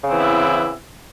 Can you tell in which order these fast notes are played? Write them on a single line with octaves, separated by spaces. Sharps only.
C#3 C4 E3 B3 E4